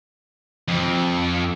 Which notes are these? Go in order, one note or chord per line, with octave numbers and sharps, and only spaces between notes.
F2